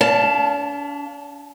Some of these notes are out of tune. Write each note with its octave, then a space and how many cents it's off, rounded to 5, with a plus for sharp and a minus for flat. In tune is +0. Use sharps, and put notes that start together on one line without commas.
D4 -45 F5 +0 A5 +10